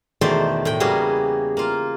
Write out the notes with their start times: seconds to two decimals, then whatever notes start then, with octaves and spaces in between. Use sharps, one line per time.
0.21 E2 B2 D#3 A3 C5 D5
0.65 A2 G5
0.80 C#3 G3 A#3 B3 F#4 G#4
1.57 A#3 F4